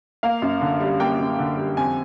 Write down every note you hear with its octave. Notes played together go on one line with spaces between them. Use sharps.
A#3 F5
F#2
D3
G3
A#3 G5
F#2
D3
G3
F2 G#5